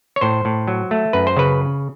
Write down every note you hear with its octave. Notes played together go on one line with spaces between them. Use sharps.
C#5
A2 C5
A2
F#3
A3
F#2 B4
C5
C#3 B4